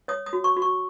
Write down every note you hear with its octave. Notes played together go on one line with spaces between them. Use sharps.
C#5 D#6
D#6
F#4
C#6
F#4
C#6